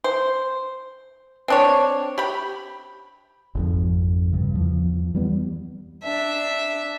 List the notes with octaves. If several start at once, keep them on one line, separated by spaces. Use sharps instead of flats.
C5
C4 D4 C#5
G4 B5
G#1 F2 F3
G2 C#3
E2 F3
E3 G3 B3
D4 E5